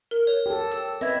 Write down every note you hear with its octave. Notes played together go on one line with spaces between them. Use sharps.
A#4
C#5
G4 A4
E6
C4 B4 D#5 E5 G#6